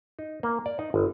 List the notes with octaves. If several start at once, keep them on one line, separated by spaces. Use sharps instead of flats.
D#4
A#3
D5
D#4
G1